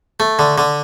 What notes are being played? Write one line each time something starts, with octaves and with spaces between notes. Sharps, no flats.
A3
D3
D3